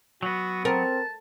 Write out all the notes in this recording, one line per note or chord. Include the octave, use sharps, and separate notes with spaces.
F#3 B3 F#4
C4 A#4 A5